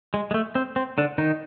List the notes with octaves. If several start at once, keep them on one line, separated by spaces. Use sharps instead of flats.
G#3
G#3
A3
C4
C4
D3 D4
D#3 D#4